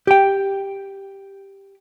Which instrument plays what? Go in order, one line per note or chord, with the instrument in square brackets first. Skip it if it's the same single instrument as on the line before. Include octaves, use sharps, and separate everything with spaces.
[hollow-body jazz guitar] G4 G5